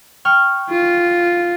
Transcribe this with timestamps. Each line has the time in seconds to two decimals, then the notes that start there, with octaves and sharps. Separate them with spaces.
0.25 G5 C#6 F6
0.70 F4